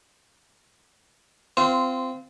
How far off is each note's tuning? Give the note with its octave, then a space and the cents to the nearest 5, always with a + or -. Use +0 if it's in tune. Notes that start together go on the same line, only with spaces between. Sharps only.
C4 -15 F4 -10 C5 -35